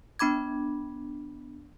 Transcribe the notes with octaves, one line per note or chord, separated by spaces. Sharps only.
B3 D4 B5 D6 G#6